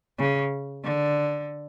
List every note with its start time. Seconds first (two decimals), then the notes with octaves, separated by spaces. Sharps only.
0.19 C#3
0.84 D3